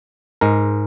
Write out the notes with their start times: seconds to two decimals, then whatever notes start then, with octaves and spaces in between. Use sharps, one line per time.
0.41 G#2 G#3 A#4